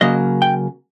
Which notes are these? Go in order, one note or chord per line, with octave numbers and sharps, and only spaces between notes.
C#3 F#3 A#3 D#5
G5